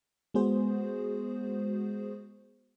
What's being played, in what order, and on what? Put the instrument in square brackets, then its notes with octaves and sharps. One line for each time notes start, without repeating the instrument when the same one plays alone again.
[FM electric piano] G#3 B3 F#4 G#4 C5